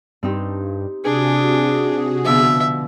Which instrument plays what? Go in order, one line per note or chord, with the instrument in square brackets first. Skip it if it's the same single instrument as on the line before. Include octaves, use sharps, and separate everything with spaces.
[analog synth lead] G2 [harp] C4 D#4 G4
[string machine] C3 F#4 [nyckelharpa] D4 [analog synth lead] G#4
[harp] B2 D3 F3 [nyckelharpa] E5